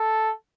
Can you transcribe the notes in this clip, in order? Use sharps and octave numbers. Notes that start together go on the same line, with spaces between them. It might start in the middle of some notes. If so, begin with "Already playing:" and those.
Already playing: A4